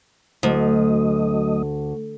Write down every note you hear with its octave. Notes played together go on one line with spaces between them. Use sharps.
D2 F#3 A3 D#5